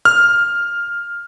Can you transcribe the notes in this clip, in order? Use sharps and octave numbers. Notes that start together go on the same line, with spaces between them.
F6